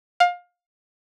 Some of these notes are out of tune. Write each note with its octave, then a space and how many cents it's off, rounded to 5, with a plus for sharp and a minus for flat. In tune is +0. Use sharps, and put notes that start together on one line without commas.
F5 +25